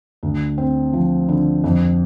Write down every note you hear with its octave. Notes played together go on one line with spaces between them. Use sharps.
D2
C4
F3
D3
F2